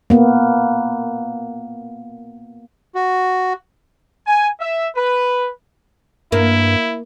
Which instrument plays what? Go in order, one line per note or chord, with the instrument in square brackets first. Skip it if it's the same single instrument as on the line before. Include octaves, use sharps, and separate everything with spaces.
[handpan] A#3 B3
[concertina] F#4
[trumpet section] G#5
E5
B4
[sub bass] G2 [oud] A#3 [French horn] E4